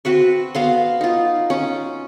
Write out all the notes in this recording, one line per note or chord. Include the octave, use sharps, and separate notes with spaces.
C4 F#4 B4 C#6
B3 F5 C6
D#4 F4
C#4